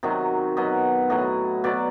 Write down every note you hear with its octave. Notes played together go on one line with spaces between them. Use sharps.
C3 D#3 F#3 D#5
B2 F#3 D#5
A2 F#3 D#5
B2 F#3 D5